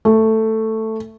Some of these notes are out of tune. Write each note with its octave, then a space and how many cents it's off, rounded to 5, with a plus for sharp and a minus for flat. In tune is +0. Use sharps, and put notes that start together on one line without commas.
A3 +5